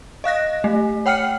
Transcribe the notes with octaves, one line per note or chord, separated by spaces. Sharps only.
D#5 F5 F#6 A#6
A3
C#5 F#5 G5 F6 C7 C#7